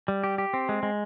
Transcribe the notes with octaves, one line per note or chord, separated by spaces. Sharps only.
G3
G4
G4
C4
G#3
G#3